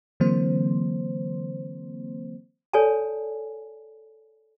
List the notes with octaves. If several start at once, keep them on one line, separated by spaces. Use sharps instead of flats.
D3 E3 F#3 A#3 C4 C5
A4 C#5 D5 G#5 A5